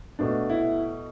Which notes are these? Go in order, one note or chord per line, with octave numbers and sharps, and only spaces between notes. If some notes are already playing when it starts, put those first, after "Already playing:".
B2 A3 D4
E4